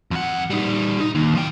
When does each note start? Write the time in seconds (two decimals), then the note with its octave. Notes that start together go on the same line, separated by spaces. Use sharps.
0.11 F2 F#5
0.50 G3 D#4
1.00 D#4
1.15 D#2
1.35 F3 G5